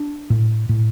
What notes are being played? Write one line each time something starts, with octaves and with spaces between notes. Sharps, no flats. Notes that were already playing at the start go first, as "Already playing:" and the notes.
Already playing: D4
A2
A2